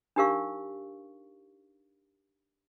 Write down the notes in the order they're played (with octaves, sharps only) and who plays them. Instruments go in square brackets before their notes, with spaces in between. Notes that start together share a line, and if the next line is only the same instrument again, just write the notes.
[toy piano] D4 D#4 G4 A#4 F5 C#6